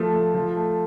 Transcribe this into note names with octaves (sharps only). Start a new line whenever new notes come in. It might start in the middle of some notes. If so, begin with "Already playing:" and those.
Already playing: F3 A3
A3
F3
A3